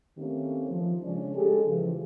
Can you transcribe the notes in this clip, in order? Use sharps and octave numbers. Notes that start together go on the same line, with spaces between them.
D#3 A3 A#3 C4 C#4 G4
F3
C#3 G#3 C#4 D4
G#3 G4 A4
C#3 E3 F3